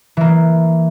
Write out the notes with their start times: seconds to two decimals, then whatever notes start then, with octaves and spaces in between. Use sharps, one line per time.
0.17 E3 A#3